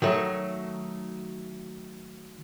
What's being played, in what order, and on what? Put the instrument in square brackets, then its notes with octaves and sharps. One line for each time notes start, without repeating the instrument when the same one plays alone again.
[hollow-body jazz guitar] D#3 F#3 A3